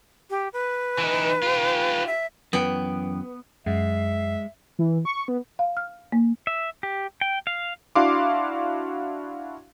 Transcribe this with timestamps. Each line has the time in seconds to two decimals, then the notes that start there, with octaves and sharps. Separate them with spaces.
0.30 G4
0.53 B4
0.98 E3 D#4
1.43 F4 G4
2.07 E5
2.53 F#2 E3 B3 G5
3.66 F#2 G#3 E5 C7
4.79 E3
5.05 C#6
5.28 B3
5.59 F5
5.77 F6
6.12 A#3
6.47 E5
6.83 G4
7.21 G5
7.47 F5
7.95 D4 E4 F#4 F5 C6 D6